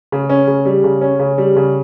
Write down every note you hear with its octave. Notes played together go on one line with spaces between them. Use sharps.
C#3
C#4
C#3
G3
C#3
C#4
C#3
G3
C#3